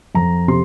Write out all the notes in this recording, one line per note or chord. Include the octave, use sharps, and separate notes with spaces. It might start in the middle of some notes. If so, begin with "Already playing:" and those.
F2 A#5
C3 C6